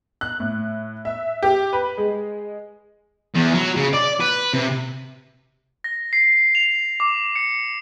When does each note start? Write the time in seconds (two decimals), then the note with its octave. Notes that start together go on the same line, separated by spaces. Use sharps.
0.21 F#6
0.40 A2
1.05 E5
1.43 G4
1.73 B4
1.98 G#3
3.35 E2
3.55 F#3
3.76 C#3
3.94 D5
4.20 B4
4.53 C3
5.84 A#6
6.13 C7
6.55 F7
7.00 D6
7.36 C#7